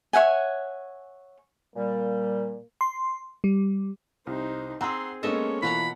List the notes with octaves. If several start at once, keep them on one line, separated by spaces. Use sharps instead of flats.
C#5 E5 F#5 G#5
A#2 G3 A#3
C6
G3
C2 D#4 C5
C4 G#4 F#5 A#5 C6 E6
G#3 A#3 B3 C#4 A4 C#5 D#5 E5
B2 E3 F4 F#5 A#5 B5